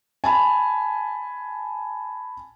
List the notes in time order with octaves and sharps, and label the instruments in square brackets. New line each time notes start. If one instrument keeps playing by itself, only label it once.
[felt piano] G#5 A5 B5